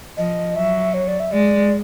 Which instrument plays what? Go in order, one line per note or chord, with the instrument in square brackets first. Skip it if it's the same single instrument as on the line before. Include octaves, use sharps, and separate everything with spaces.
[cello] F3 [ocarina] D#5
[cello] F#3 [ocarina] E5
[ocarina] C#5
D5
E5
[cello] G#3 [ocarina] D5